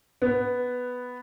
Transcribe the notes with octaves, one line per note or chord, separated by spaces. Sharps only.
B3